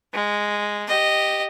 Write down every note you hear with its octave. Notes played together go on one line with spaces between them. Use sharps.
G#3
G4 D#5